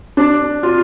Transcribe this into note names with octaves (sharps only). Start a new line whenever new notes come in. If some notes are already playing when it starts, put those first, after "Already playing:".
D4
F4